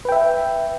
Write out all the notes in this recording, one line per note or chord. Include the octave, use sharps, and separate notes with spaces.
B4 E5 G5